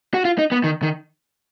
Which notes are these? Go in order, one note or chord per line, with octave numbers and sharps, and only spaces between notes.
F#4
F4
D#4
B3
D#3
D#3